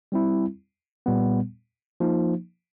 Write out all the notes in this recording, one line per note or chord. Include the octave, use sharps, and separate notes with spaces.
G3 C4 E4
A#2 G3 B3
F3 A#3 D#4